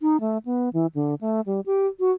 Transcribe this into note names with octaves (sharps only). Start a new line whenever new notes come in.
D#4
A3
B3
E3
D3
A3
G3
G4
F#4